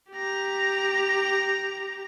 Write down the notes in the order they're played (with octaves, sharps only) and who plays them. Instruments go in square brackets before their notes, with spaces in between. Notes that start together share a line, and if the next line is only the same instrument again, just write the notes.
[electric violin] G4 A#5